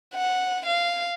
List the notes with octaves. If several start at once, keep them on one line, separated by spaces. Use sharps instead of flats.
F#5
F5